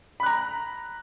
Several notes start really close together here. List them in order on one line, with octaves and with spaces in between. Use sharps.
B5 F#6 A#5